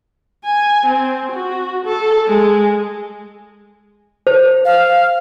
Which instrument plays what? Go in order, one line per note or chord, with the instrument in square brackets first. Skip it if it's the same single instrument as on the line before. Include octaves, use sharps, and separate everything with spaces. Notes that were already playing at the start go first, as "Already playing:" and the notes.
[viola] G#5
C4
F#4
A4
G#3
[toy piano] C5
[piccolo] F5